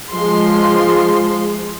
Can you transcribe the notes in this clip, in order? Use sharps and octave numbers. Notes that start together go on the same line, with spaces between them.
F3 G#3 C6